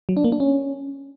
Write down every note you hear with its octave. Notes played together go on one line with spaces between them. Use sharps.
F#3
D4
A#3
D4
C#4